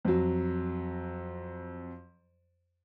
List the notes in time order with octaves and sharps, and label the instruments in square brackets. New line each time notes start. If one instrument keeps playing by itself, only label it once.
[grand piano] F2 F#3